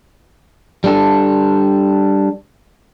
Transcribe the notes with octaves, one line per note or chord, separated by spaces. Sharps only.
G3 D4 A4